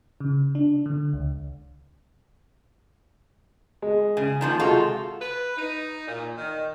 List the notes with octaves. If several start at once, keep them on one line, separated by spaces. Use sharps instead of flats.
C#3
D4
D3
C#2
G#3
C#3 G#5
D#3 F3 A#3
C3 G#3 F4 F#4 A4
B4
D#4
A#2
D#3